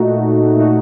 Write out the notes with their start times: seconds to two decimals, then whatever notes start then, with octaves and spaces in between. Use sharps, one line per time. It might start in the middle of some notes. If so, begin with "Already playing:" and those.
Already playing: A#2 A3 D#4 F#4
0.56 A#2 A3 D#4 F#4